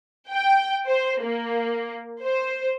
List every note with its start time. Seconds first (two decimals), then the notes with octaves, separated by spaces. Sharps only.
0.30 G5
0.88 C5
1.23 A#3
2.21 C5